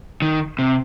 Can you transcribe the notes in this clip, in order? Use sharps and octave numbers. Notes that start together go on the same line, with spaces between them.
D#3
C3